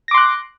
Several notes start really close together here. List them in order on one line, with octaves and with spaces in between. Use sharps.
A#6 D6 C6 F#6